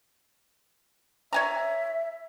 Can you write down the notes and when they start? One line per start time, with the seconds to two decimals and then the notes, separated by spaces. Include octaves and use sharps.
1.33 C#5 E5 G#5 A#5